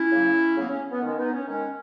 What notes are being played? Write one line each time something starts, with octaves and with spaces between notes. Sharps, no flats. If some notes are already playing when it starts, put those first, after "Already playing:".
Already playing: C#4 E4
C#3 F#3 A#3
C#3 F#3 A#3 B3
C#4
B3
D#3 G#3 C#4
B3 D#4
C#4
D#3 G#3 C#4